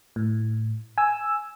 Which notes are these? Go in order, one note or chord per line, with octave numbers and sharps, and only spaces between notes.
A2
G#5 E6